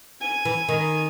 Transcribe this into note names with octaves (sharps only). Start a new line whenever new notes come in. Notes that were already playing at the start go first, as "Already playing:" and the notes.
G#5
E3
D#3